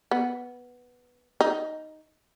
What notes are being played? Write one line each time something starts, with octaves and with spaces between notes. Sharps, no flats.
B3
D#4